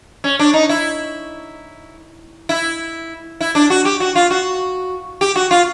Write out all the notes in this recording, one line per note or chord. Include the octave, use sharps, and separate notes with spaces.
C#4
D4
D#4
E4
E4
E4
D4
F#4
G4
F#4
F4
F#4
G4
F#4
F4